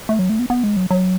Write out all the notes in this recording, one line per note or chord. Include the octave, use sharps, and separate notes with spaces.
A3
F#3
A3
B3
B3
G#3
F#3
F#3